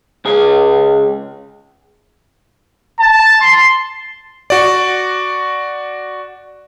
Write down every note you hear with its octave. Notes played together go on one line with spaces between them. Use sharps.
C#2 G#4
A5
C6
F#4 D5